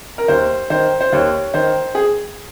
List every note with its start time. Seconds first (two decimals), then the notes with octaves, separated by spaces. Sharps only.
0.18 A#4
0.28 D#2 C5
0.70 D#3 C5
1.00 C5
1.12 D#2 C#5
1.54 D#3 C5
1.95 G#4